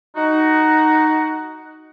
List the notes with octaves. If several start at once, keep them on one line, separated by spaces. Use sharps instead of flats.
D#4 F#4